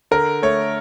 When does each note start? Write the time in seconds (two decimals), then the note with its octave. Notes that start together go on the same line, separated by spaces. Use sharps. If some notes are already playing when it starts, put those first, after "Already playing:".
0.11 D3 A#4
0.43 A3 C#5